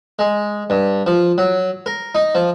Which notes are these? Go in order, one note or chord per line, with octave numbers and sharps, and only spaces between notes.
G#3
G2
F3
F#3
A#4
D#4
F3